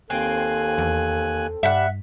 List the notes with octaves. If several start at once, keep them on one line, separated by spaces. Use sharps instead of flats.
D#2 C4 A4 G#5 F#6
E2
G2 G3 E5 F#5